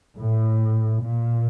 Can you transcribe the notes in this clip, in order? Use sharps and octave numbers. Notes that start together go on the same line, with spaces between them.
A2
A#2